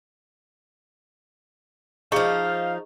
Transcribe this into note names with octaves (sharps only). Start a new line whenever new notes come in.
F3 D#4 G#4 D#5 F5 C#6